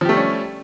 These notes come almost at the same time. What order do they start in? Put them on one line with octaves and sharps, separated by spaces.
F3 G4 A3 G3 C#4